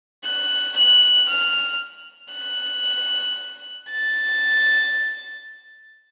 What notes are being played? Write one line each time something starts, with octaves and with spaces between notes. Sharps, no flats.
F#6
F#6
F6
F#6
A6